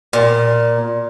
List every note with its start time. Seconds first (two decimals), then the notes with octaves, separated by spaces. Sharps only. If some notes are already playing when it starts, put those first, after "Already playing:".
0.13 A#2